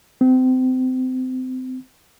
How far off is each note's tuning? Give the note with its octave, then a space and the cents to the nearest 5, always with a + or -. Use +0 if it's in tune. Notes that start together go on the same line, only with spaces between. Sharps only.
C4 -30